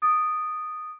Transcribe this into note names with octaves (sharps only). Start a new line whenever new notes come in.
D#6 A6 D7